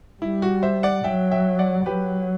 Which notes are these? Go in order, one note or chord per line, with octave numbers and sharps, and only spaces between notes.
G3 E4
F#4
C5 E5
D5 F#5
F#3 E5 G5
E5 G5
D5 F#5
F#3 G4 B4